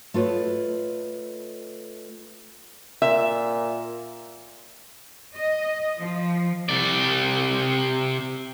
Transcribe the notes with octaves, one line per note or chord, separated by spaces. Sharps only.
A3 F4 B4 C#5 D#5
A#2 E5
D#5
F3
C3 D5